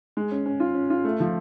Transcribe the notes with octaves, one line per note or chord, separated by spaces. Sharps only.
G#3
C#4
C#4
F4
C#4
F4
A3
F3